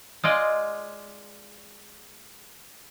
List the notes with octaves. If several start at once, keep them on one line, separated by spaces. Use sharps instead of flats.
G#3 F4 D5 D#5